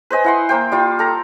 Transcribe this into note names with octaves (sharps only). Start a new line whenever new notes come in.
B4 C5 D#5 G#5
E4 F#5 C6
A#3 C5 G5
G3 F4
A4 A#5